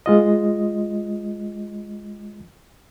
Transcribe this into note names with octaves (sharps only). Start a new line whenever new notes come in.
G#3 F4 D#5